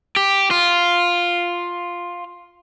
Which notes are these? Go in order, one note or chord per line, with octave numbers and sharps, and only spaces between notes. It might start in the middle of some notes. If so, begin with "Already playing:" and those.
G4
F4